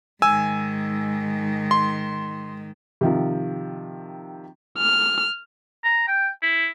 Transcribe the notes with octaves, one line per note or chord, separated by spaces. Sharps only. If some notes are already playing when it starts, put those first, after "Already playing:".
G#2 D#3 G#5 E6
C6
C3 D#3 F3
F6
A#5
G5
E4